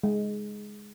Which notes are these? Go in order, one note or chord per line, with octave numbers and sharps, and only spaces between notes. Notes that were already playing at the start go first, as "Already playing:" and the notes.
G#3